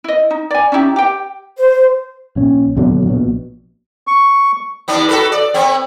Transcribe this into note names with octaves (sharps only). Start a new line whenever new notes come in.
E4 D#5
D#4
D5 G#5
C#4 D#4 E4 G4
G4 G5
C5
A#1 C#4
D#2 B2 D3 F#3
A#1 B2
C#6
D#2 B3 D4
F#4 A4 B4
D5
B3 C4